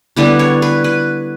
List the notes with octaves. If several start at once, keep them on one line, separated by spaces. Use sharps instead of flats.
D3 G3 B3 D4 E4
C#5
B4
B4